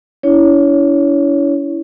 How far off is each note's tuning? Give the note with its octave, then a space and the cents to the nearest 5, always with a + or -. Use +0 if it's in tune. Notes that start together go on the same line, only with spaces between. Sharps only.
C#4 +45 E4 +0 C#5 +15